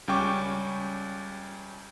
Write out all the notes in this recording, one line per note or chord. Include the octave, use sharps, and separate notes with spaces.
C#2 G3 C#4 G5 C#6 D6